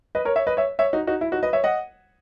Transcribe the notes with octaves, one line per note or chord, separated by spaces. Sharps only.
B4 D#5
A#4 C#5
C#5 E5
B4 D#5
C#5 E5
C#5 E5
D#4 F#4
D#4 F#4
E4
D#4 F#4
B4 D#5
C#5 E5
D#5 F#5